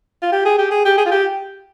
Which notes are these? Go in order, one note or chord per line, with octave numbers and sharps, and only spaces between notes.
F4
G4
G#4
G4
G#4
G4
G#4
F4
G4